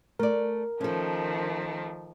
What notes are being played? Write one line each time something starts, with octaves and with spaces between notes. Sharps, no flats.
A3 A#4 D5
D#3 F3 A3 C#4 A4